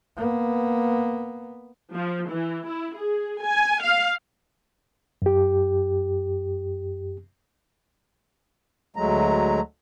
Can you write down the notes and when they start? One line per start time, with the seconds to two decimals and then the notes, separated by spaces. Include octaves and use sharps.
0.17 A#3 B3
1.94 F3
2.31 E3
2.68 E4
2.98 G#4
3.45 G#5
3.83 F5
5.22 F#2 G4
8.96 D2 F#3 G#3 A3 A#5